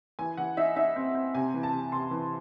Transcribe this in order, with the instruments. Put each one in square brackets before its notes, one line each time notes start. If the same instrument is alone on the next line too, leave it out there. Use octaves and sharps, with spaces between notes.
[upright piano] E3 G#5
E3 F#5
D#4 E5
D#4 E5
C4
C4
C3 G#5
E3
A5
C3
C3 C6
E3